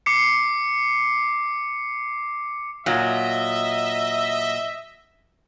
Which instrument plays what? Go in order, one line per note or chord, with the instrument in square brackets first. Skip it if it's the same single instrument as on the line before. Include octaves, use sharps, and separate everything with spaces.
[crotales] D6 C7 C#7
[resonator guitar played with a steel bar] A#2 F#3 [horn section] D#5 E5